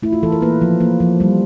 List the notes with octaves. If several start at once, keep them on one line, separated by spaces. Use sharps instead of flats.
A3 E4
F4
E3 A4
A#4
A#3 B4
F3
A#3
F3
G3